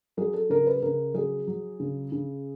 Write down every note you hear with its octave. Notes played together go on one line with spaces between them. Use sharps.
F#3 G#4
A4
C#3 A#4
B4
C#3 A#4
F#3 G#4
F#3
C#3
C#3